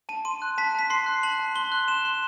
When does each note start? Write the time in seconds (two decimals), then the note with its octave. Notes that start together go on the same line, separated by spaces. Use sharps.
0.09 A5 D#7
0.25 C6 D#7
0.42 F#6
0.58 A5 B6
0.75 A5 B6
0.90 C6 C7
1.06 F#6
1.23 A5 F#7
1.40 A5
1.56 C6 G7
1.72 F#6
1.88 C6 E7
2.05 C6